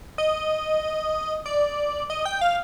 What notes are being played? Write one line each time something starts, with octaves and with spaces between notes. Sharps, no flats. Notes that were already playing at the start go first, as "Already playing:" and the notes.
D#5
D5
D#5
G5
F5